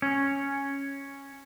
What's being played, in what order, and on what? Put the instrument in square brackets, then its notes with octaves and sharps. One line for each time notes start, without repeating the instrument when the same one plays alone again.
[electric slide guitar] C#4